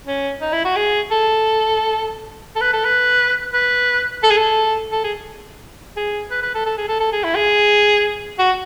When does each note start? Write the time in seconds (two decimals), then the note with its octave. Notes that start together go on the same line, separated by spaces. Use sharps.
0.06 C#4
0.41 D#4
0.52 E4
0.65 F#4
0.76 G#4
1.11 A4
2.56 A4
2.61 B4
2.73 A4
2.85 B4
3.54 B4
4.23 A4
4.30 G#4
4.37 A4
4.92 A4
5.04 G#4
5.96 G#4
6.31 B4
6.43 B4
6.54 A4
6.66 A4
6.78 G#4
6.88 A4
7.00 A4
7.12 G#4
7.24 E4
7.35 G#4
8.39 F#4